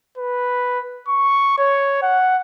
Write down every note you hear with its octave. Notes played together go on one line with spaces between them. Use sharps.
B4
C#6
C#5
F#5